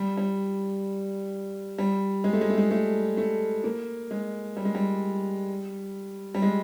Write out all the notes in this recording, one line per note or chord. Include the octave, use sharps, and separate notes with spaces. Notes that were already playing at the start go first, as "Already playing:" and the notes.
Already playing: G3
G3
G3
G#3
A3
G#3
A3
G#3
A3
A3
A#3
G#3
G3
G#3
G3
G3
G#3